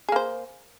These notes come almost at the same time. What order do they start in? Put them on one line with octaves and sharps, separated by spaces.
G#4 A#3 C5